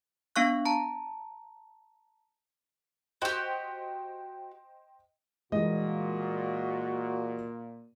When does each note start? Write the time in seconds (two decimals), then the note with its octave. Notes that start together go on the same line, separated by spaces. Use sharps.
0.36 B3 D4 F5 C#6 F#6
0.65 A5 A#5
3.22 F#4 G4 C5 D#5 G5
5.52 A#2 E3 G3 G#3 F#4 D#5